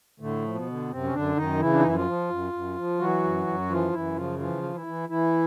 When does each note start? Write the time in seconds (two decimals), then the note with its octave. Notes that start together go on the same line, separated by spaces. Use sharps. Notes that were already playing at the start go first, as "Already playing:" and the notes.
0.20 A2 D3 A3
0.44 F3
0.55 B2 B3
0.66 D3
0.90 F#2 C3 C4
1.03 C#4
1.13 F#2 D3 D4
1.36 F#2 D#3 D#4
1.59 C#3 E3 E4
1.73 D4
1.80 D#4
1.84 F#2 E4
1.95 F3 F4
2.06 F3
2.30 F#2
2.53 F#2
2.76 F3
2.99 E3 F#3 F#4
3.24 F#2
3.47 F#2
3.70 E3 F3 F4
3.92 F#2 E3 E4
4.16 C#3 F3 F4
4.39 E3 F3 F4
4.63 E3
4.74 E3 E4
4.86 E3
5.09 E3 E4